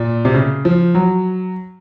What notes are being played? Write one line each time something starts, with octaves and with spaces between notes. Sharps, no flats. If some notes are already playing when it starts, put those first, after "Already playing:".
Already playing: A#2
C3
C#3
F3
F#3